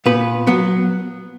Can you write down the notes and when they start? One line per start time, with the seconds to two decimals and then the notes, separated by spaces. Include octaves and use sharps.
0.06 A#2 B3 B4
0.47 F#3 B3